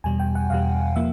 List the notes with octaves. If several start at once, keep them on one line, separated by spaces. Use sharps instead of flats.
E2 B2 G3 G#5
G5
F#5
E2 B2 G3 F5
F3 A#3 E5